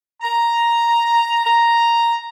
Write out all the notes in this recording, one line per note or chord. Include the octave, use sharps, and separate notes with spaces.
A#5
A#5